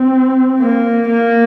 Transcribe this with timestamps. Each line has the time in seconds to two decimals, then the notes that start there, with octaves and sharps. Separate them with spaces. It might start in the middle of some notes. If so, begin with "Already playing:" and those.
Already playing: C4
0.60 A#3
1.09 A#3